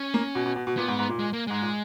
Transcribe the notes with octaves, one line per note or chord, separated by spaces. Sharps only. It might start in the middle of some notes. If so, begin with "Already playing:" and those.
Already playing: C#4
A#3
B2
B2
B2
B2
A#2 B3
G#2
G#2
A#2
G#3
A#3
G#2 G#3
A#2